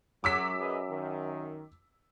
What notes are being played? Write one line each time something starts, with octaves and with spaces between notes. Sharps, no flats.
F#2 F#3 D6 E6 B6
G#4 B4 D#5
D#3